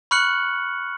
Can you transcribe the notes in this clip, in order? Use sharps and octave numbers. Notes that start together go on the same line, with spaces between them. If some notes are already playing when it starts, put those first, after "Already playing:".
B5 C#6 F6 F#6 C#7 F#7